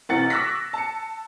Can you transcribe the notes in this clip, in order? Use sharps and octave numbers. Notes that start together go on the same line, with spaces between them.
B1 C3 E3 F#5 A6 C#7
C#6 D6 E6 F#6 A#6 B6
A5 C#7